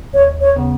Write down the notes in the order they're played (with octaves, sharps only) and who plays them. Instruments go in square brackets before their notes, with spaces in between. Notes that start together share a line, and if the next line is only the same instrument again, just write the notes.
[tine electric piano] D#2 [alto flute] C#5
[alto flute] C#5
[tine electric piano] C#3 B3